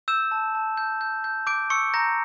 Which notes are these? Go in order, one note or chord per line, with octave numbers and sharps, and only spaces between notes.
E6 G6 E7
A5
A5
G6
G6
G6
D6 G6 D7
C#6 E6 C#7
A#5 G6 A#6